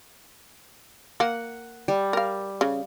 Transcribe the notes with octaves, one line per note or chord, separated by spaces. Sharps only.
A#3 F#5
G3
A#4 F5
C#3